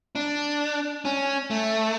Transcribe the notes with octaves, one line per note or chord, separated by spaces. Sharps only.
D4
C#4
A3